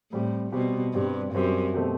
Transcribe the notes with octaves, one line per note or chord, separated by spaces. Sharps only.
A2 G3 C4 G4
B2 G3 C4 G4
G2 G3 C4 G4
F#2 G3 C4 G4
B2 A3 C4 G4